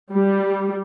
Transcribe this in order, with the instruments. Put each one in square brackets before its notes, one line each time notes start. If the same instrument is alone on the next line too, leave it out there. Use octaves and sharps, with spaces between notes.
[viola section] G3